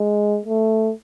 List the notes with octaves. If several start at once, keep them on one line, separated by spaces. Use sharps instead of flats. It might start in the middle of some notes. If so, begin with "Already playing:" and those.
Already playing: G#3
A3